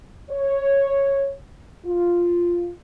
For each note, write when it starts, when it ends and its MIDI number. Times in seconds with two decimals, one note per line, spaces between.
0.30 1.33 73
1.86 2.69 65